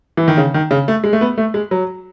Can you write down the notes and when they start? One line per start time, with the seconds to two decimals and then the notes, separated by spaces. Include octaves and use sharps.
0.17 E3
0.28 D#3
0.37 C#3
0.54 D#3
0.71 C#3
0.88 A3
1.04 G#3
1.13 A3
1.21 B3
1.38 A3
1.54 G#3
1.71 F#3